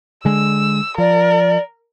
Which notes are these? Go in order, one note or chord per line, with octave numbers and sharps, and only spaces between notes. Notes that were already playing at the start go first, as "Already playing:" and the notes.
D3 G#3 E6
F3 A#4 D5